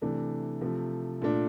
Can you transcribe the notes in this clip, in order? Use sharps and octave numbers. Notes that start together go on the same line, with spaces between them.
C3 E3 A3 D4
C3 F3 A3
A#2 A3 D4